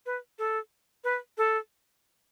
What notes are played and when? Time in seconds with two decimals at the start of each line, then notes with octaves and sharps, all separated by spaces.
0.06 B4
0.39 A4
1.04 B4
1.38 A4